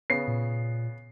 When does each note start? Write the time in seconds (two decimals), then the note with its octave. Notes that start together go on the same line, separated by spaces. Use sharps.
0.10 C#3 B3 C7
0.28 A#2